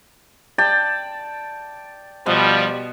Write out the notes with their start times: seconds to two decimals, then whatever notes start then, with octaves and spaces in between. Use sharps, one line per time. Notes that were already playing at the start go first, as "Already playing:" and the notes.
0.58 D5 G5 A5
2.26 B2 F3 G3